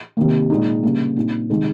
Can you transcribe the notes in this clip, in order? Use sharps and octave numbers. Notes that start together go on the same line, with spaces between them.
C3 D#3 A#3
A#2 G#3 D#4
C#3 G3 A#3
A#2 G3 C4 D#4
C3 D#3 G#3 D#4